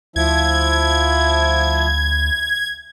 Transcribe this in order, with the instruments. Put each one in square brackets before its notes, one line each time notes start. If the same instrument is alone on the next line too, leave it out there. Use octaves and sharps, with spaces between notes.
[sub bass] D2 [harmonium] F3 E4 [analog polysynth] G#6